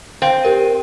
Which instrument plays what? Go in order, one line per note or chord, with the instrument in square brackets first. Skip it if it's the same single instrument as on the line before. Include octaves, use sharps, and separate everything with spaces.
[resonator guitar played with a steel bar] C4 [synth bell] F5 G6
[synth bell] G4 A#4 D#7